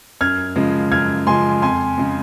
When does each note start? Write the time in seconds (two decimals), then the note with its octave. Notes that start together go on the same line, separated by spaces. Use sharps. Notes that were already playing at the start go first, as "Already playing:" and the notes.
0.21 F#2 F6 G#6
0.56 C#3 F3 G#3
0.92 F#2 F6 G#6
1.27 C#3 F3 G#3 G#5 C6
1.62 F2 G#5 C6
1.98 C#3 G#3